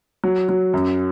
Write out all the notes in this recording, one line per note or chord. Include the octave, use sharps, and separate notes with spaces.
F#3
F#3
F#2